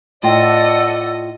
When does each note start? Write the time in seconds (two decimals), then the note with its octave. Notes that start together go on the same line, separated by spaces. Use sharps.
0.23 A2 F4 A4 D5 D#5 F#5 G5